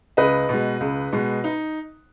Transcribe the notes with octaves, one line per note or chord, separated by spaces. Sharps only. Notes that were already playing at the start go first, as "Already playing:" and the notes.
C#2 B4 D#5
B2 G#3
C#2
B2 G#3
D#4